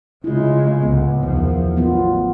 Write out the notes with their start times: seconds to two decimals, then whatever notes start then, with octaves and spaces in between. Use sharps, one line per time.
0.24 C#3 G#3 E4 F4
0.82 C#2 A2 B3
1.23 E2 D#3 F3
1.76 A1 F#3 B3 F4